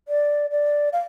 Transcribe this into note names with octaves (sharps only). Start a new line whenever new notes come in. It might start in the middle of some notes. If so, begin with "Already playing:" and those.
D5
D5
F5